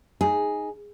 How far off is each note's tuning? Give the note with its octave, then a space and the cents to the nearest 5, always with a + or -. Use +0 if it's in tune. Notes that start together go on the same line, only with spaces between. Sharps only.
D#4 +0 G#4 +0